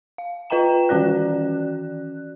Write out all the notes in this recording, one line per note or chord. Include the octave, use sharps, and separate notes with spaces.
F5
F4 B4 D#5 G5 A#5 E7
D#3 E3 C#4 F#4 D5 F#6